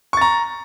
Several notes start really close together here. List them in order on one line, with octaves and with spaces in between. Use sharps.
C#6 A6 A#5